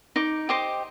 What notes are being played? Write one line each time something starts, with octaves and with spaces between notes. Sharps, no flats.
D#4 D6
G4 C5 D#5 D6